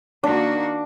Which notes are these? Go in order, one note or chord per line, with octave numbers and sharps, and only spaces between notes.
D#3 A#3 D4 F#4